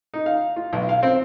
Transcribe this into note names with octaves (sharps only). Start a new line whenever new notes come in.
D#4
F5
F4
B1
F5
C4